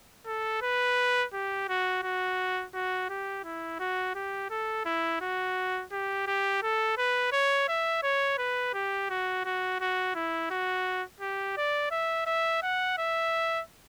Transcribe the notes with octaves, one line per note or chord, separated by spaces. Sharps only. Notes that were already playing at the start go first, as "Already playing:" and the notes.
A4
B4
G4
F#4
F#4
F#4
G4
E4
F#4
G4
A4
E4
F#4
G4
G4
A4
B4
C#5
E5
C#5
B4
G4
F#4
F#4
F#4
E4
F#4
G4
D5
E5
E5
F#5
E5